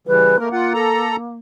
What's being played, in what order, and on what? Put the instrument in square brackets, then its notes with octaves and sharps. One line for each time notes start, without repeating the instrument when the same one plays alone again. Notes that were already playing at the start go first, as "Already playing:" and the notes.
[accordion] C#3 E3 G3 [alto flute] B4
[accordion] A3 A#4 [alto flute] A#3
[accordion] F4 F#5
A4 A#5